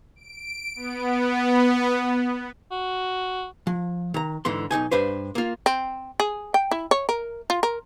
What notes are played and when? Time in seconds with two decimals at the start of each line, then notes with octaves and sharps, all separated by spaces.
0.16 D7
0.76 B3
2.71 F#4
3.67 F3
4.14 D#3 A#5
4.45 G#2 D3 E3 C6
4.71 B1 F#2 D#4 G#5
4.91 G2 D4 B4 C5
5.35 A#3 F4
5.66 C4
6.20 G#4
6.54 G5
6.71 E4
6.91 C#5
7.09 A#4
7.50 F4
7.63 A#4